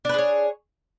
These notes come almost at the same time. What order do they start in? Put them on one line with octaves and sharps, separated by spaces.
D4 B4 G#4 C#5